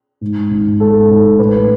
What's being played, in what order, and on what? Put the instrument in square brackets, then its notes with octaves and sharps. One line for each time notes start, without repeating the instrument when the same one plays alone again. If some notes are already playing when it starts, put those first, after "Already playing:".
[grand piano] G#2
G#1
G#2 A4
G#1
A1 B4